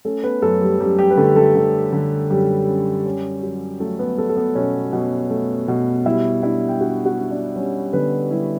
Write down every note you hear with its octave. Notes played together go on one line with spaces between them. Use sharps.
A3 C#4 A4
B3 B4
F#2 A3 A4
G3 G4
F#2 G3 G4
G3 G4
B4
D3 A3 A4
A3 A4
D3
D3
F#2 G3 G4
C#4
C#4
F#3
F#3 A3 A4
B3 B4
A3 A4
A4
B3 B4
B2 C#4 C#5
B2
A3
B2
G3 E4 E5
D4 E4 E5
G5
D4 F#4 F#5
F#4 F#5
D4
D4 D5
G3 C#4 C#5
D3 B3 B4
G3 E4